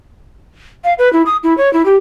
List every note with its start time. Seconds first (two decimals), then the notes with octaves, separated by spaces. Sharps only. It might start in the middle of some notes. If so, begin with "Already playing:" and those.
0.84 F5
0.99 B4
1.13 E4
1.26 D#6
1.43 E4
1.58 C#5
1.73 E4
1.85 G4